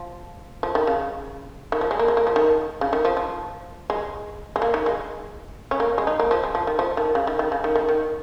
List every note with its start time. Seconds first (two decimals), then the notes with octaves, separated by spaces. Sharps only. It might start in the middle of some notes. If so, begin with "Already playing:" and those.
Already playing: F3
0.63 F3
0.75 D#3
0.87 C#3
1.72 D#3
1.81 F3
1.91 G#3
1.99 A#3
2.08 G#3
2.17 A#3
2.27 F3
2.36 D#3
2.81 C#3
2.93 D#3
3.05 F3
3.17 F3
3.90 G#3
4.56 G#3
4.62 A#3
4.74 D#3
4.86 G#3
5.71 C#4
5.80 A#3
5.98 G#3
6.07 D#4
6.20 A#3
6.31 F3
6.43 G#3
6.55 F3
6.67 D#3
6.79 F3
6.97 D#3
7.15 C#3
7.27 D#3
7.39 D#3
7.52 C#3
7.64 D#3
7.75 D#3
7.88 D#3